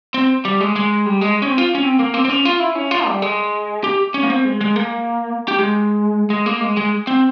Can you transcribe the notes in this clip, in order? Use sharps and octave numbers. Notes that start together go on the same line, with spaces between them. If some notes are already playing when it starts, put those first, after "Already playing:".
C4
G3
G#3
G#3
G3
G#3
C#4
C4
F4
C#4
C4
A#3
C4
C4
C#4
F4
E4
C#4
F4
G3
G#3
G4
C#4
A#3
C4
G#3
G#3
A#3
G4
G#3
G#3
A#3
G#3
G#3
C4